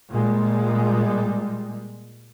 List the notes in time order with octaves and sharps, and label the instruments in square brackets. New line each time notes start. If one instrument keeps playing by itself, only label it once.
[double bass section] A#2 G3 G#3